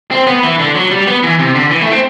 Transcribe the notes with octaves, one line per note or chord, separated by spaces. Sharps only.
C4
B3
E3
D3
F#3
G3
B3
E3
C3
D3
E3
A3
C4